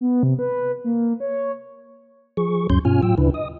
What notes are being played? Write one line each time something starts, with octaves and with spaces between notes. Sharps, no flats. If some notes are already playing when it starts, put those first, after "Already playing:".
B3
C3
B4
A#3
C#5
F3 G#4 C#6
D2 G2 F#3 C#4 C6 G6
G2 B2 C#4 F4 G#5 F6
A2 F#3 F4 G5 E6
D2 C#3 D4 E4 B4
D#5 D#6